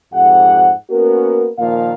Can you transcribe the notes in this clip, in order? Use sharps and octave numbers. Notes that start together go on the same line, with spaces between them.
F2 G#2 G4 F#5
A#3 B3 C#4 F#4 A#4
A#2 D#3 F3 A#3 F5